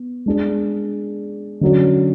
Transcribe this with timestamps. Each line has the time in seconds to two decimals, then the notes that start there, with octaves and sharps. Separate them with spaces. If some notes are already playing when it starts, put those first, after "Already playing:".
Already playing: B3
0.26 G#3 D4 G#4
1.61 D3 F#3 C#4